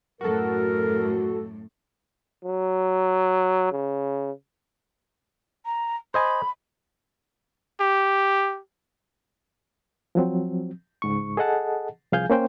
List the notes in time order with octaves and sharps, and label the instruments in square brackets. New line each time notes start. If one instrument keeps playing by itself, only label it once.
[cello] F#2 A2 [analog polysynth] F#4 A4 [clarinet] A#4
[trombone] F#3
C#3
[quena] A#5
[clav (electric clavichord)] C5 D#5 G#5 [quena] B5
[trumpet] G4
[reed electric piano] F3 F#3 C4
C#2 G#2 C#6
G#4 A4 D#5 F#5 A5
C2 F3 G#4 F5 G#5 G6
A#3 C#4 C5 G5